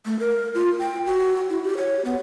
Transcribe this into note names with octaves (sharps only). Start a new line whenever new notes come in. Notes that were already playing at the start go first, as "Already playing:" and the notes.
A3
A#4
F4
G5
F#4
E4
G4
C#5
B3